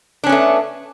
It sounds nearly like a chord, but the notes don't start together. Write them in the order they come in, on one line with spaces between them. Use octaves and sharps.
D4 C#4 B3 A3